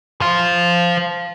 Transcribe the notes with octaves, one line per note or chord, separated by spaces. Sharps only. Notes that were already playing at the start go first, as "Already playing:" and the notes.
C5 F5